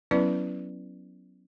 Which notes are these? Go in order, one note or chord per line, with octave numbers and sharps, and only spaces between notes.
F#3 B3 C#4 E4 B4 D5